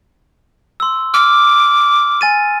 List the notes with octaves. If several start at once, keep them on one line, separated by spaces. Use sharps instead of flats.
C6 E6
D6 F6
G#5 A6 D#7